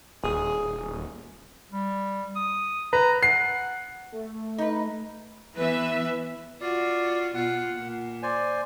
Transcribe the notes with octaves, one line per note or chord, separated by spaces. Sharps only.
D#1 G#4
G3
D#6
B4 A#5
F#5 C7
A3
D#4 B4
E3 B3 B4 E5
F4 F#4 D5
B2 F4 F#5
A#2
C5 D5 G#5